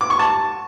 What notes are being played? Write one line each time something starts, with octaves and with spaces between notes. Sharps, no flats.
D6
C#6
A5